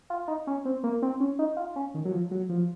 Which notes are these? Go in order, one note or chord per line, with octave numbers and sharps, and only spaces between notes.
F4
D#4
C#4
C4
A#3
C4
C#4
D#4
F4
C#4
D#3
F#3
F3
F#3
F3